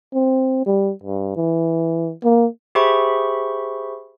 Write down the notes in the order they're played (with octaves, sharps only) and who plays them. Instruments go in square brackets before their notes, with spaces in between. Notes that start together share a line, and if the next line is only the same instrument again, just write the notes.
[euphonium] C4
G3
G2
E3
A#3
[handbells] G4 G#4 C5 E5 B5 C#6